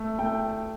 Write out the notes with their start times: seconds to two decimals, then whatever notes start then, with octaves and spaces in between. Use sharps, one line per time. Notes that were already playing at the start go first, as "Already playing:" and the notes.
Already playing: A3
0.18 A3 G5